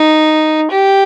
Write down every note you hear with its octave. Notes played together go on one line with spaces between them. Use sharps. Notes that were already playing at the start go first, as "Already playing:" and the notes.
Already playing: D#4
G4